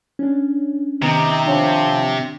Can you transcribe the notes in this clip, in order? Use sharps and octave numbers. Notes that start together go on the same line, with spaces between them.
C#4 D4
C3 D#3 B3 D#4
F3 D4 C#5 G5